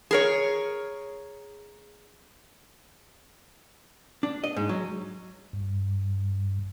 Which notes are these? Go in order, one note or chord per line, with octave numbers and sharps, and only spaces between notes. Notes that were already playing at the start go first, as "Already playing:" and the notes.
G#4 A#4 C#5
D4
D#5
G#2
F#3
G2